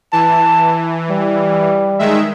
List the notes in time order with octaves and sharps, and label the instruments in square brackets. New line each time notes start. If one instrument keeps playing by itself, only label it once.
[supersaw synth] E3 [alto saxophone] A5
[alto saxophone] G3
[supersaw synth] D#3 G#3 E5